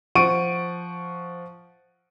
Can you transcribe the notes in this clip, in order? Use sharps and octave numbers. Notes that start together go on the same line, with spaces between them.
F3 F#5 C#6 D7 D#7